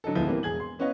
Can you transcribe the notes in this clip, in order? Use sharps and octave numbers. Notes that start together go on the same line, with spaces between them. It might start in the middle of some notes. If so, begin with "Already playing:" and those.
D3 F#3 D#4 A4
D2 A2 F3 G#3 B3
E3 G3 A#3 C4
E1 G#4 G#6 F#7
C6
B3 C#4 B4 C#5 D#5 F5